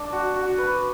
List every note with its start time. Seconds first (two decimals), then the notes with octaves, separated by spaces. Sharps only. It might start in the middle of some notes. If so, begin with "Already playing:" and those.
Already playing: D4
0.12 F#4
0.36 F#4
0.58 B4